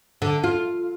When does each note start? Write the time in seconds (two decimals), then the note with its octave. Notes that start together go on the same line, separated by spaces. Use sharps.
0.22 D3
0.44 F4